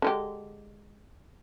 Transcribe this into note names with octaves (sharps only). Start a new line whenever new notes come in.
D3 G#3 G4